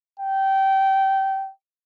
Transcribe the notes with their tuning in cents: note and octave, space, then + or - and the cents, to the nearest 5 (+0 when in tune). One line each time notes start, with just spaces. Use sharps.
G5 -20